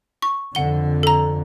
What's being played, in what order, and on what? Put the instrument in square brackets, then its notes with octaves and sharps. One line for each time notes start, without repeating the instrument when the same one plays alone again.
[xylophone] C#6
[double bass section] F2 D3 [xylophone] F#5 G7
[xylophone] A4 A#5